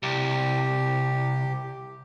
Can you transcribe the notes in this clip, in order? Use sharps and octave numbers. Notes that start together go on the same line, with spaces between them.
C2 G4